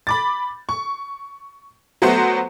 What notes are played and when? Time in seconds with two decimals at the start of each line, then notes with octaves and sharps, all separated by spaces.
0.07 B5 D6 A6
0.69 C#6
2.02 F#3 A3 B3 F#4 C5